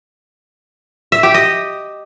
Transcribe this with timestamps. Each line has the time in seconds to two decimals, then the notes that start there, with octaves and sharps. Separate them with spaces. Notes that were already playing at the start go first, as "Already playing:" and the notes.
1.12 E5
1.23 G4
1.34 D#5